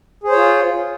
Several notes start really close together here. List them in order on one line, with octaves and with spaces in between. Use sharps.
G#4 C5 C#5 F4